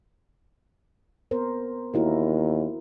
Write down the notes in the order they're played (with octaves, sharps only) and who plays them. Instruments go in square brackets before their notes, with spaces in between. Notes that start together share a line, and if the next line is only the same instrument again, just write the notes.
[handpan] B3 A#4 C5
[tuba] D#2 [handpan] E4 F#4 A#4